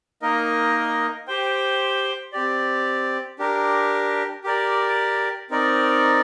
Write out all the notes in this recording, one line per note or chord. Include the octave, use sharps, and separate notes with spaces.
A#3 D#4 A#4 D#5
G4 C5 G5
C4 G4 D5
D4 G4 A#4
G4 A#4 D5
C4 D#4 A#4 D5